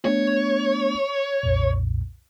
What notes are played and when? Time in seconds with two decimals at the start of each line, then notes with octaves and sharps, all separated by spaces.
0.05 A3 B3 D4 C#5
1.43 B1 F2 A#2